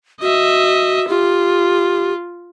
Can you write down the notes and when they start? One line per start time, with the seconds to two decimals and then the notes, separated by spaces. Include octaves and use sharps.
0.22 F#4 D#5 E5
1.08 F4 G4